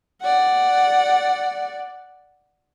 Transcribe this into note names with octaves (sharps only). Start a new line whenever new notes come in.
D5 F#5